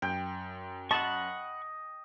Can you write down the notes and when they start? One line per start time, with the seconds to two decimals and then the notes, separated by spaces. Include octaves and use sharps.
0.02 F#2 G5
0.91 D#5 F#5 A5 B5 C#6